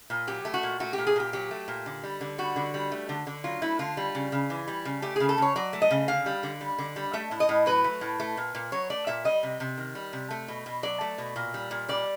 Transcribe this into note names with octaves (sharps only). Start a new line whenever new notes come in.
A#2
F#3 G4
A3
F#4
A#2
A3 F#4
G4
A#2
G#4
A#2 G4
F#3 G4
A3
A#2
D3
G3
D3
G3 F#4
D3
G3
A3
D3
D3
F#3 F4
A3 E4
D3 F4
G3
C#3
C#3
E3
G3
C#3
A3 G4
C#3 G#4
A4
C#3 C#5
F#3 D5
A3
D#5
C#3
D3 F5
G3
D3
G3
D3
G3
A3 E5
A2
D#5
A2
F#3 B4
A3
A2
A3
A#2
A#2
F#3 C#5
A3 D5
A#2 E5
G3 D#5
C3
C3
D#3
G3
C3
A3
B2
B2
F#3 D5
A3
B2
A#2
G3
A#2
G3 D5